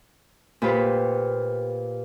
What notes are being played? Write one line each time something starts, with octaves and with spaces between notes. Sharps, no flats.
A#2 G4 B4 C5